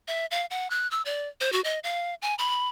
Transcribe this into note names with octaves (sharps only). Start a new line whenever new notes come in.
E5
F5
F#5
F#6
E6
D5
C5
F#4
D#5
F5
G#5
B5